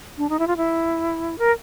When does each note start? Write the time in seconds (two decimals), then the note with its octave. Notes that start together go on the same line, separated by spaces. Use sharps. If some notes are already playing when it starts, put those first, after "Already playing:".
0.18 D4
0.30 D#4
0.39 E4
0.47 F4
0.57 E4
1.39 A#4